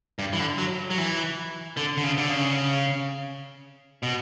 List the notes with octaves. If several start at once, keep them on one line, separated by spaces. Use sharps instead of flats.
G2
E3
D3
F#3
F#3
E3
D3
D3
C#3
D3
C#3
B2